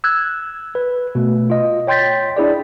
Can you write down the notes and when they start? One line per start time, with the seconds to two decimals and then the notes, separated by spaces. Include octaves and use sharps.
0.04 E6 F#6 G#6
0.75 B4
1.15 B2 A3
1.50 F4 D#5
1.87 C#5 G5 C6 G6 A6 B6
2.37 D4 E4 G#4 D5